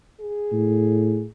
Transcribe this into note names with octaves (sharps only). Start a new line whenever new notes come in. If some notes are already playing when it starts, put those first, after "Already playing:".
G#4
A2